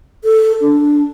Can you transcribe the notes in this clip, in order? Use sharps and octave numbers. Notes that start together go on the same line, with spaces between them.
A4
D4